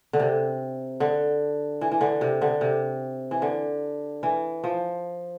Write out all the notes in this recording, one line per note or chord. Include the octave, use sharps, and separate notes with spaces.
D3
C3
D3
E3
E3
D3
C3
D3
C3
E3
D3
E3
F3